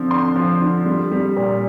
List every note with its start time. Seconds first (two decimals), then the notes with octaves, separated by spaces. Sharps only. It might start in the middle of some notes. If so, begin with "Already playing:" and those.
Already playing: D3 F3 C4
0.11 D3 C6
0.36 F3
0.61 D3
0.86 G3
1.11 G3
1.37 A#2